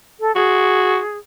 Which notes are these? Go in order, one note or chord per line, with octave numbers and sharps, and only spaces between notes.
A4
F#4 G#4